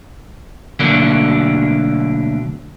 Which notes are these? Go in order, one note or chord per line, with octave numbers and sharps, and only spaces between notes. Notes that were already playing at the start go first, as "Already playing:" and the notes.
D2 B2 D3 F#3 A#3 D4